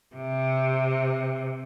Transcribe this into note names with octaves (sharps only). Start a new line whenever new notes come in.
C3